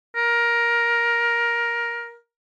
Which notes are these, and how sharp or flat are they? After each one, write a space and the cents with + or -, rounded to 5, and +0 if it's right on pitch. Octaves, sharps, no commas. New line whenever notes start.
A#4 +15